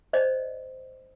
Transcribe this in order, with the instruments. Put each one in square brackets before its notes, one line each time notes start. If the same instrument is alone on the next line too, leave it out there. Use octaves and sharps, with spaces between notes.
[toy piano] C5 D5 D#5